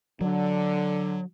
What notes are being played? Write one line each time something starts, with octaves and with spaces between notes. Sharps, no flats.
D3 F#3